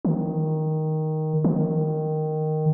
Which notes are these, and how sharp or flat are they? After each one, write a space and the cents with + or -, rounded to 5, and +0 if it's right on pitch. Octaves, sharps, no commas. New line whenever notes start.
D#3 +5
D#3 -5